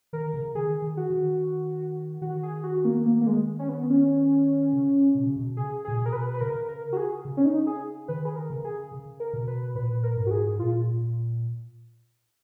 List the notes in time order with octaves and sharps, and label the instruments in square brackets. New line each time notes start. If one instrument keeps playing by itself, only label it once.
[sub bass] D#3 [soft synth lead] A#4
[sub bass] C#3
[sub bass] D#3 [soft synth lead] G#4
[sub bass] D#3
[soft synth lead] F#4
[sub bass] D#3
[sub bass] D#3 [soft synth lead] F#4
[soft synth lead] G#4
F#4
A#3
A#3
A#3
G#3
C#4
B3
C#4
[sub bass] C#3
B2
C#3
B2
[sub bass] C#3 [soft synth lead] G#4
[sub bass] A#2 [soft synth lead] G#4
[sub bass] B2
[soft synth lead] A#4
B4
B4
[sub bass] C#3 [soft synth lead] A#4
[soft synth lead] A#4
F#4
G#4
[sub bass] C#3
[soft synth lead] C#4
D#4
G#4
[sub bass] D#3 [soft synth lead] B4
[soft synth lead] G#4
A#4
[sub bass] C#3
[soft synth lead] G#4
[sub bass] C#3
[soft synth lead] A#4
[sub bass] B2
[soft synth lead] B4
[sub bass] A#2 [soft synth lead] B4
[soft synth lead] A#4
[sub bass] G#2
[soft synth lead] F#4
G#4
[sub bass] A#2 [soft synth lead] F4